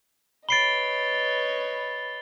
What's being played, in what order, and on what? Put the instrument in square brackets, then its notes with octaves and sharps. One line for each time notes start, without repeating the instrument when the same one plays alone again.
[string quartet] B4 C#5 D#5 [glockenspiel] B5 C7 D7 [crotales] A6 G7